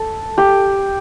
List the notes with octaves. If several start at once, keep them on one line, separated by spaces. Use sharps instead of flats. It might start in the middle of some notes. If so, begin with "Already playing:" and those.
Already playing: A4
G4